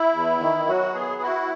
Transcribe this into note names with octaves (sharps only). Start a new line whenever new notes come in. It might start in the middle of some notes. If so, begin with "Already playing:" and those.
Already playing: E4
E2
D#3
F#3 F#4
B3 G#4
E4 F#4